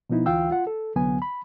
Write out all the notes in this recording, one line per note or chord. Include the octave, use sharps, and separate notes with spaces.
B2 F3 B3 D#4 E4
D2 E3 F4 F5 G5 E6
F4 F#5
A4
C2 D3 F#3 B3 G#5
B5